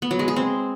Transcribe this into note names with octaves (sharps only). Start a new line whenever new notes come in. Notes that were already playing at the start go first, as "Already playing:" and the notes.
B3
F#3
G#3
G#4
C4